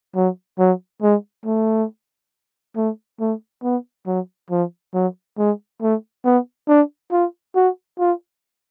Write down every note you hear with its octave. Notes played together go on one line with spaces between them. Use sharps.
F#3
F#3
G#3
A3
A3
A3
B3
F#3
F3
F#3
G#3
A3
B3
D4
F4
F#4
F4